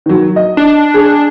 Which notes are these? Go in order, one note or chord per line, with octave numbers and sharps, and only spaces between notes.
D#3 F#3
D#5
D4
G#4